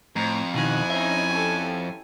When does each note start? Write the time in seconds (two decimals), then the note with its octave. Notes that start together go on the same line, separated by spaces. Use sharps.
0.16 F2 A2 A#5
0.54 B2 D#3 E4 G#5 F#6
0.90 C#4 D#4 E5
1.28 C#4 G4 A4